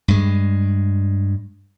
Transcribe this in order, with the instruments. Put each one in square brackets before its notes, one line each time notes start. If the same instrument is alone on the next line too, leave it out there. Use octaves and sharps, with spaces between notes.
[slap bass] G2 G#3